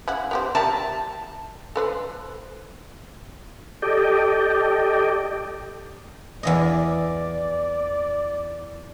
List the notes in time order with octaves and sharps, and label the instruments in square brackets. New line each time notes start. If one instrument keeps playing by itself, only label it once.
[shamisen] C#3 E4 F#5
B3 G4 C5
[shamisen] G4 A#4 E5 [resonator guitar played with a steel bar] A5
[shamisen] A4 B4 C5
[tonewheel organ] G4 A4 D5 D#5 G5
[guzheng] E2 E3 D#5 [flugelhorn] D5